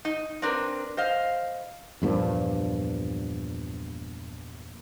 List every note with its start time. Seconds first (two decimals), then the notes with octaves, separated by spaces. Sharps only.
0.05 D#4
0.42 C4 D4 A#4 B4
0.97 C5 D#5 F5
2.02 E2 G2 A#2 F3